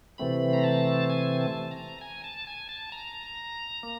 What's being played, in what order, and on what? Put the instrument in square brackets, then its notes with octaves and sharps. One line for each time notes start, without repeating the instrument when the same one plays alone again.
[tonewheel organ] C3 E3 A3 C4 B5
A#5
A5
G#5
A5
A#5
G#5
A5
G#5
A5
A#5
A#3